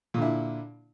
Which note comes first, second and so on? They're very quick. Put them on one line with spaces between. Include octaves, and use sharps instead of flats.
A#2 D3 E4